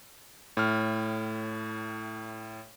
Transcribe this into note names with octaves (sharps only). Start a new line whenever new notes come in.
A2 F6